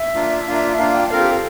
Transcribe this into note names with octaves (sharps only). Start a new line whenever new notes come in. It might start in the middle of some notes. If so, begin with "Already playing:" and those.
Already playing: E5
A#3 D4 F4
A#3 D4 F4
A#3 D4 F4 F5
G5
C4 F4 A4 A#4 F5
G4
A4